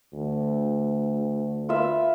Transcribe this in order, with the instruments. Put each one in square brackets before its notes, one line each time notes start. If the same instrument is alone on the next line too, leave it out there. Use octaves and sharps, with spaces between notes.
[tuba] D2
[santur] F4 B4 E5